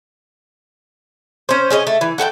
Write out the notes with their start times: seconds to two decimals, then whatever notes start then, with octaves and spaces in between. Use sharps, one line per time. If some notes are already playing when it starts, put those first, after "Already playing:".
1.49 C#4 C5
1.70 C#4 G#4 C5 D#5
1.87 A3
2.01 E3
2.18 F#4 A4 F#5 G5